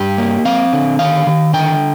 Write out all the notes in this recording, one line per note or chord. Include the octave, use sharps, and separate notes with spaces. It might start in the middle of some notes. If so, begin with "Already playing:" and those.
Already playing: G2 G4
A#3
C4 F5
D3
D#3 F5
D#3
D3 G5